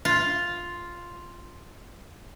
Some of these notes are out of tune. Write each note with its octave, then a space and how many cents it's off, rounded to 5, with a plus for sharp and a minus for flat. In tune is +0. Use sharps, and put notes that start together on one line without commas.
F4 +0